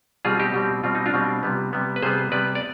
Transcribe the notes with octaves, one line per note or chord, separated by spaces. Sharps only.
B2 G3 C4 F4 G#4
D#4 G4
B2 G3 C4
B2 G3 C4 F4
D#4
D4 F4
B2 G3 C4
C3 G3 B3
C3 G3 B3
B4
C3 G3 B3 G#4 C5
C3 G3 B3 B4 D5
D5